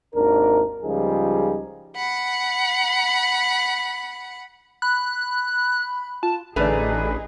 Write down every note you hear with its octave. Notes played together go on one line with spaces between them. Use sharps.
G#1 D#2 D4 A#4
C#2 C#3 F3 G3 D#4 G#4
F#5 B5
B5 F#6
F4 A5
A1 D3 A3 D4 D#4 G#4 B4